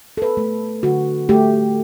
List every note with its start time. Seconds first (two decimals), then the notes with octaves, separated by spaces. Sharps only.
0.17 A4
0.22 B4
0.37 A3
0.83 D3 F#4
1.29 A3 G4